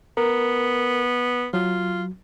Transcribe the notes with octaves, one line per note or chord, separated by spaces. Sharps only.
B3 A#4
F#3 F4